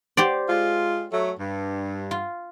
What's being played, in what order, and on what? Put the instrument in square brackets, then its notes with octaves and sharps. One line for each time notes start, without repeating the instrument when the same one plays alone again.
[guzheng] G4 C5 D5
[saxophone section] G#3 F4
F#3 A3
G2
[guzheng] F4